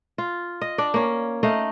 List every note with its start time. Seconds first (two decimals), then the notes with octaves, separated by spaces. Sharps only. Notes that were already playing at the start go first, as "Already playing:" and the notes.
0.18 F4
0.61 D#5
0.78 D4 D5
0.94 A#3 C#4
1.43 A3 D#4 D#5 F5